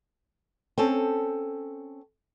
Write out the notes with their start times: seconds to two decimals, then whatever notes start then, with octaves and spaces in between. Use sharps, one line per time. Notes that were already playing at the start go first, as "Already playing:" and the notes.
0.78 C4 C#4 A4